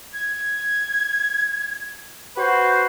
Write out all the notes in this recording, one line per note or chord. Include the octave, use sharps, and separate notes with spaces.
G#6
F#4 B4 C5